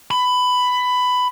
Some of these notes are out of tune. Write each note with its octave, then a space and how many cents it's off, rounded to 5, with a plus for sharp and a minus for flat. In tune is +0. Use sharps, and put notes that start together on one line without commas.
B5 +15